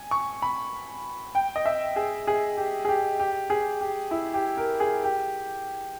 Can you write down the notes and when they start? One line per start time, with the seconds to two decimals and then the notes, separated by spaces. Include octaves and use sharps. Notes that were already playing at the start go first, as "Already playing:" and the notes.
Already playing: G#5
0.11 C#6
0.42 B5
1.35 G5
1.56 D#5
1.66 E5
1.96 G#4
2.27 G#4
2.57 G4
2.85 G#4
2.89 G4
3.20 G4
3.50 G#4
3.81 G4
4.11 E4
4.34 G4
4.57 A#4
4.80 G#4
5.04 G4